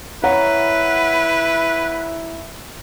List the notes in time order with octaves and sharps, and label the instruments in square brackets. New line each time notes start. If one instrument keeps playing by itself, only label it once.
[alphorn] E4 [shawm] B4 [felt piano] C#5 F#5 A#5